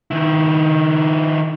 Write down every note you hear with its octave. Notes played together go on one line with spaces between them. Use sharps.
D#3 E4